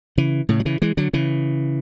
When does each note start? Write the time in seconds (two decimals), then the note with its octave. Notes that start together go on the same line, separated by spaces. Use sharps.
0.18 C#3 E3
0.49 A2 C#3
0.60 F#3
0.65 C#3 E3
0.82 E3 G#3
0.97 D3 F#3
1.13 C#3 E3